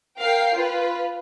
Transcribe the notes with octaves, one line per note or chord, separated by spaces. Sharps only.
A#4 F5 G5 C7
F4 B4